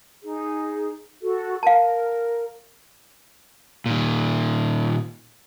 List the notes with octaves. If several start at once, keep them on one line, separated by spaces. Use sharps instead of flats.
D#4 G#4
F#4 A4
A#4 F5 A5
A#2 D#3